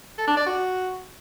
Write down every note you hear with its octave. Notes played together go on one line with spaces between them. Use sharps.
A4
D4
D5
F#4